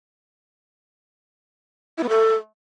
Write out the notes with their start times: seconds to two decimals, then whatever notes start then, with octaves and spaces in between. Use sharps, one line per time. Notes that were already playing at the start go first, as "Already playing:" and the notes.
1.98 E4
2.03 B3
2.09 A4